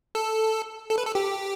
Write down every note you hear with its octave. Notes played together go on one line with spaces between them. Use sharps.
A4
A4
B4
A4
G4